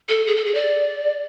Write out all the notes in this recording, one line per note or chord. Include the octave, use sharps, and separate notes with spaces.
A4
G#4
A4
G#4
D5